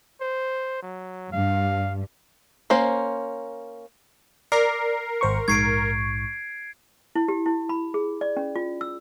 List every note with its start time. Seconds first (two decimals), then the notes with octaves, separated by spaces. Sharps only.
0.21 C5
0.82 F#3
1.32 G2 F5
2.70 A#3 C#4 C5
4.52 A#4 D5 C7
5.21 G#1 C5 C#6
5.48 A#1 G#2 C#6 G#6 C7 D7
7.15 E4
7.28 G4
7.46 E4
7.69 B5
7.94 G#4
8.21 D5
8.37 C#4
8.56 F4
8.81 E6